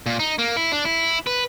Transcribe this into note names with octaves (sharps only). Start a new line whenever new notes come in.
A#2
D#4
A#3
E4
D4
E4
B4